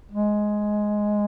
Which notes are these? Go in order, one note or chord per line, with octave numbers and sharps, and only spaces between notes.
G#3